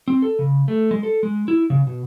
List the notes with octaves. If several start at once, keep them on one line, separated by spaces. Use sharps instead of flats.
C4
A4
C#3
A3
G#3
A4
G#3
E4
C#3
B2